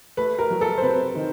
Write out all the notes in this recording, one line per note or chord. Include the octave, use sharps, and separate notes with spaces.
A3 B4
A#4
F#3
A4
C5
C3 B4
D#3